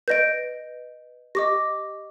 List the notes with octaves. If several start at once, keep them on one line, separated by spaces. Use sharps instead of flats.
B4 D#5 G6 A#6 D7
G4 D#5 D6 A#6